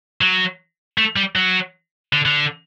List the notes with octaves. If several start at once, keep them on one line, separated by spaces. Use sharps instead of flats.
F#3
A3
G3
F#3
D3
D3